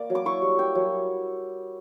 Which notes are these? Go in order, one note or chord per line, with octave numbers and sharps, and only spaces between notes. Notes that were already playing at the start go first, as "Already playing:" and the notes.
Already playing: A#3 D5
F#3
D6
E4 C#6
G3
E4 G5
F#3